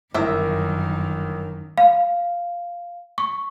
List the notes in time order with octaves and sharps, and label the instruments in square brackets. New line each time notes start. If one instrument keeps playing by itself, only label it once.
[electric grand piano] G1 A#4 [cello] F#2 D#3 [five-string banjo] E4 E5
[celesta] F5
C#6